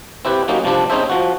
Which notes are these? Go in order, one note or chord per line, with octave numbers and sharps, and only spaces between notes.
C4 E4 G4 B4
F#3 A#3 C#4 D#4 G4
C3 F3 G3 C4 D4
C4 C#4 D#4 G#4 C5 E5
F3 F#4